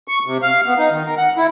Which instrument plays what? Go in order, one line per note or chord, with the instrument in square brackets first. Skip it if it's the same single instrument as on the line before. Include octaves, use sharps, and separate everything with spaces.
[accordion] C#6
C3
F5
B3
D#4
D#3
A#4
F#5
E4